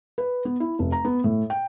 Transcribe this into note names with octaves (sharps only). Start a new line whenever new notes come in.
B4
B3
E4
F1
A#5
B3
A2
G5